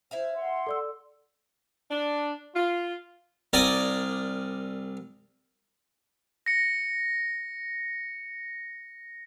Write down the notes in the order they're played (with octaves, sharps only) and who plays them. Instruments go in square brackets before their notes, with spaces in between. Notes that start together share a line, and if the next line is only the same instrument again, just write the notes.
[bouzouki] E4 E5 F5 [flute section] C5
[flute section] F#5 C6
[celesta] A4 D5 E6
[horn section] D4
F4
[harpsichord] C2 A#4 D5 G5 G#5 D#6
[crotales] A#6 C#7